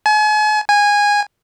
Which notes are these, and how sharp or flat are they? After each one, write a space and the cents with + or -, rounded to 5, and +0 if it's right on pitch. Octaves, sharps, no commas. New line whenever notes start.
G#5 +40
G#5 -15